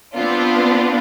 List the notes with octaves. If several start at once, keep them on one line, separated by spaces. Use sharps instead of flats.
B3 C4 D4 F4